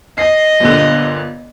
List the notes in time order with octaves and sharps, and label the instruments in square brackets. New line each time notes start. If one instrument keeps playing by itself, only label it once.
[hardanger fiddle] D#5 [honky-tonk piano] C7
[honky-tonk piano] G1 A#2 D3